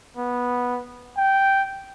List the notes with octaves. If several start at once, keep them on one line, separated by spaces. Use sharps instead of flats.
B3
G5